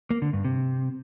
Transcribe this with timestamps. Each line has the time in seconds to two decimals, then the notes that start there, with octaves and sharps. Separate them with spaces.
0.11 A#3
0.22 D3
0.33 G2
0.45 C3